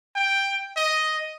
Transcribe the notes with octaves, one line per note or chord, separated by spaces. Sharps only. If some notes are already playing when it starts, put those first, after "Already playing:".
G5
D#5